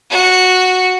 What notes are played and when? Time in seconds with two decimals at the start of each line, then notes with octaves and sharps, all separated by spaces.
0.11 F#4